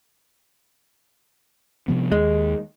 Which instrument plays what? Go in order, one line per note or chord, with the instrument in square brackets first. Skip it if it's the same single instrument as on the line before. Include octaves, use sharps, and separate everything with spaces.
[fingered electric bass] C3 F3 B3
[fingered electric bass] D#2 [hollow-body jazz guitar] G#3